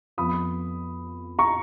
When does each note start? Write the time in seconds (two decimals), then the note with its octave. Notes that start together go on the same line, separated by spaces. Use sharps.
0.17 F2 F3 B3 B5 D#6
1.39 A#5 C#6